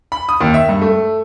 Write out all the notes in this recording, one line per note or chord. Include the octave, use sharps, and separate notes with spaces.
B5
D#6
D#2
E5
G2
A3